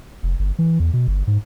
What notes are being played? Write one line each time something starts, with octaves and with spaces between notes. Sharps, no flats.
F1
G1
E3
E2
B2
G1
G#2